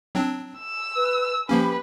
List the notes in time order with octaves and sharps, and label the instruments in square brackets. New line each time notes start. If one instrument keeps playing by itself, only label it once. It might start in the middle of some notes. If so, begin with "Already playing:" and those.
[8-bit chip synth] F#3 C4 D4
[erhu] E6
[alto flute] B4
[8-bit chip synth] F3 A#3 C#4 [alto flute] G4 [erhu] B4